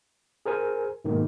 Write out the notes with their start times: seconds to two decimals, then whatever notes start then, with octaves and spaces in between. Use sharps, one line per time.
0.46 G#4 A#4 C5 G#5
1.05 G#2 B2 D#3 G#3 A#3